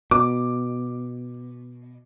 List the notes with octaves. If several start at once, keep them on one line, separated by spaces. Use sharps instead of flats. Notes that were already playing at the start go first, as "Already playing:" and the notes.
B2 D6